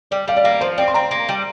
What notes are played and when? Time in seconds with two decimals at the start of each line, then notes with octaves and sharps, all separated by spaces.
0.11 G3 D5
0.28 G3 F5
0.37 D5
0.44 A#3 F5
0.61 F3 C5
0.78 C4 D5
0.88 C6
0.94 C4 A#5
1.11 A#3
1.29 G3